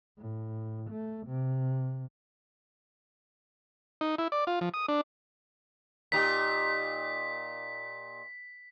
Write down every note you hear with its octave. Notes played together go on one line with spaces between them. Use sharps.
A2
A3
C3
D#4
E4
D5
F4
F3
D#6
D4
A#2 D#4 G4 B6